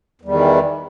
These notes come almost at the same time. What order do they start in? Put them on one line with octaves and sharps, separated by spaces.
E2 G3 D#3 E3